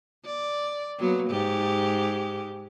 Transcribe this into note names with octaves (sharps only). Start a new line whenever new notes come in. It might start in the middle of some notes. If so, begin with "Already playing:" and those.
D5
F#3 A#3 B3
G#2 G4